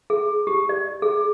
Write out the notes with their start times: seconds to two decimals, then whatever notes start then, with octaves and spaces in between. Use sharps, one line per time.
0.10 G#4
0.47 G4
0.69 D5
1.02 G#4